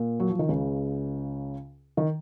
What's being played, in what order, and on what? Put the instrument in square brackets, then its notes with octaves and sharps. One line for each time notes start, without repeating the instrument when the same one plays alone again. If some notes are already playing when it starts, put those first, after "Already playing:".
Already playing: [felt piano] A#2
F#3
F3
D#3
C#2 C#3
D#3